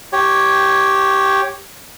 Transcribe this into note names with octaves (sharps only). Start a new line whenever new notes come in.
G4 C#5